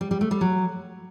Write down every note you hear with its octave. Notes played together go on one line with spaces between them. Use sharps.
G3
G3
A3
G3
F#3